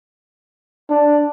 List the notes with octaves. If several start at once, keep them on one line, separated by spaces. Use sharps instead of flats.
D4